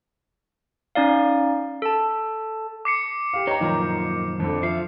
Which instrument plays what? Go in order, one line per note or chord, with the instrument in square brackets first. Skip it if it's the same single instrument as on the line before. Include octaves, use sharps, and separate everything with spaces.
[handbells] C#4 D#4 D5 F5
A4 A5
[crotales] D6 C7 C#7
[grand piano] G4 F5
[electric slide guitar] D#4 [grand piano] C#5 G5 A#5
[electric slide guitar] F#2 A#2 F3 [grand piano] D#3 A#5
[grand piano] F2 D3
[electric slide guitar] F3 [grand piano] E5 [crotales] C7